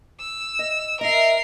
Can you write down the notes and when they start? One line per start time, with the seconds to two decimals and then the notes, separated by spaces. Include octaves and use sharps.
0.20 E6
0.59 D#5
1.01 A#4 D#5 E5 C7